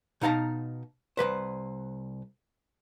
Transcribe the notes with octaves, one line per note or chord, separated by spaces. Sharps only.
B2 D#4 F5 A5 A#5
C2 C#3 B4 C5